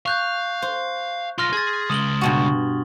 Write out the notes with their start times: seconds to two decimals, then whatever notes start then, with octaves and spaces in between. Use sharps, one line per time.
0.06 F5 C#6 F#6 G6
0.62 C5
1.38 B1 F4 C6 F6 A#6
1.53 G#4 G#6 A6
1.90 C#3 G#3 D#6 F#7 G7
2.21 G2 B2 F#4